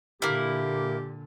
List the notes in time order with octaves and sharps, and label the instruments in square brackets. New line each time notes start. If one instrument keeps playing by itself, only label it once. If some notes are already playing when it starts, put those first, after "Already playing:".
[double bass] A#2 D3 [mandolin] A#3 E4 [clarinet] G4